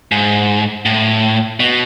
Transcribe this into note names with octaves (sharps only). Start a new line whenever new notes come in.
G#2
A2
B2